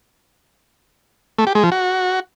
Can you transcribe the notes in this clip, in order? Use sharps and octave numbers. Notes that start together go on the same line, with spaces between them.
A3
G4
G#3
F3
F#4